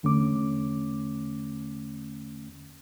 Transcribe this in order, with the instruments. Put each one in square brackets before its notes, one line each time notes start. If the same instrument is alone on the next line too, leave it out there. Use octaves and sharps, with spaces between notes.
[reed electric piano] E2 D3 A3 C#4 D6